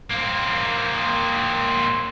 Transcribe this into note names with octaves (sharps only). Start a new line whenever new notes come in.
A#3 C4